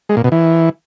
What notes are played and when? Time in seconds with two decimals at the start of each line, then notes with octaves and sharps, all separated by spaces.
0.09 G#3
0.17 A#2
0.24 B2
0.32 E3